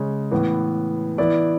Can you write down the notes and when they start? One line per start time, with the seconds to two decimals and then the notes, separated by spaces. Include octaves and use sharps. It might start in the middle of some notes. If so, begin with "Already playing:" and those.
Already playing: C#3 G#3 C#4
0.31 A2 E3 B3
1.18 E3 B3 E4 D5